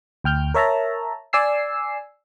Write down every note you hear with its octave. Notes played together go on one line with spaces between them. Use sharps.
D2 G5 F6 G6
A#4 C#5 E5 A5 A#5
D5 G#5 E6 C7